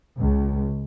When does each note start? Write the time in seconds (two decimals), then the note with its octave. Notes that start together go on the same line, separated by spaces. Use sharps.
0.18 C#2